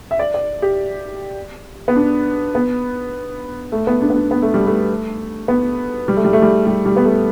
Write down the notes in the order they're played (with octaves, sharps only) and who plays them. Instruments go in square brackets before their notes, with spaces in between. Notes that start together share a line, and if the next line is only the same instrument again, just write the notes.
[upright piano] E5
D5
D5
G4
B3
D4
B3
A3
B3
D4
B3
D4
B3
A3
G3
A3
B3
G3
A3
G3
A3
G3
G3
G3
B3
A3